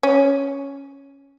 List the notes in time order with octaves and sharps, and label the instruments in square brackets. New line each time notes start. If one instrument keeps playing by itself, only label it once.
[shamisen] C#4